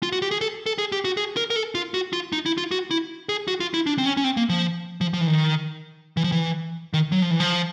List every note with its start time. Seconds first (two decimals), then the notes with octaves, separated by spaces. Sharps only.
0.03 F4
0.12 F#4
0.22 G4
0.31 G#4
0.41 A4
0.66 A4
0.78 G#4
0.92 G4
1.05 F#4
1.17 G#4
1.37 A#4
1.50 A#4
1.56 A4
1.75 F4
1.94 F#4
2.13 F4
2.33 D#4
2.46 E4
2.58 F4
2.71 F#4
2.91 E4
3.29 G#4
3.48 F#4
3.60 F4
3.74 E4
3.87 D4
3.98 C4
4.05 C#4
4.17 C#4
4.24 C4
4.37 A#3
4.49 F3
5.01 F3
5.13 F3
5.21 E3
5.27 D#3
6.17 E3
6.24 F3
6.32 E3
6.93 D#3
7.12 F#3
7.22 F3
7.31 E3
7.40 F3